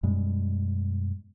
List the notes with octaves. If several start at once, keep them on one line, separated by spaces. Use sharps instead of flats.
F#2 B2 G3 G#3